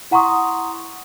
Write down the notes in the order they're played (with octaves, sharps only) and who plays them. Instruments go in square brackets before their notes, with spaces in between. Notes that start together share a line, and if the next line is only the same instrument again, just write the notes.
[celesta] E4 F#5 A#5 C6 C#6 D#6